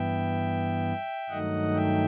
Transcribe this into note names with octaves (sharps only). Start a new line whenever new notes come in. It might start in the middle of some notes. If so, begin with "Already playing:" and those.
Already playing: G2 E3 B3 E5 G5
G2 D#3 F#3 A3 D#4 D#5 F#5
E5 G5